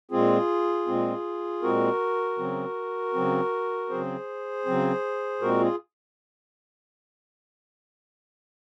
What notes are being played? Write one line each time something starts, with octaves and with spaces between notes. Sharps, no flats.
A#2 G#3 C4 F4 G#4
A#2 G#3 C4
A#2 G#3 C4 F#4 A#4
C#3 F#3 C4
C#3 F#3 C4
C#3 F#3 C4 G#4 C5
C#3 F#3 C4
A#2 G#3 C4 F#4 A#4
F4 G#4